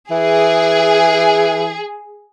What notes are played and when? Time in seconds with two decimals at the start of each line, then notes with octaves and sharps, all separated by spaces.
0.11 E3 G#4